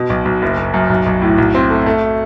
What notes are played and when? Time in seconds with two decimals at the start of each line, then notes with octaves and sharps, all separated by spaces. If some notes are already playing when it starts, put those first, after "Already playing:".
Already playing: B2
0.10 B1
0.25 B1
0.42 F#1
0.57 F#1
0.74 F#2
0.90 B1
1.06 B1
1.22 A2
1.38 B1
1.55 C4
1.70 A3
1.86 A3